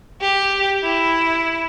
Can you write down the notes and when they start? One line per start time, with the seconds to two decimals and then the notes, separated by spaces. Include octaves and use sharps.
0.21 G4
0.83 E4